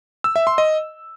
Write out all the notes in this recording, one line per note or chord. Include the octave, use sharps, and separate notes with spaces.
E6
E5
C6
D#5